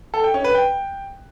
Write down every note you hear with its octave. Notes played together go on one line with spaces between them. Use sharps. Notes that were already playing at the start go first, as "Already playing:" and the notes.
A4
G5
C#4
B4
G5